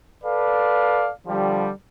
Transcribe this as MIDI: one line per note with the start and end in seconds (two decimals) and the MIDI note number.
0.24 1.10 69
0.24 1.10 71
0.24 1.10 74
0.24 1.10 77
1.27 1.70 50
1.27 1.70 53
1.27 1.70 55